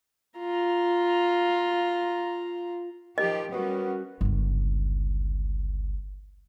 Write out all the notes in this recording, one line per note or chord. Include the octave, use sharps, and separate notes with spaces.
F4 A#5
D#3 F3 G4 D#5
G3 B3 C#4 F#4 A#4
G1 C#2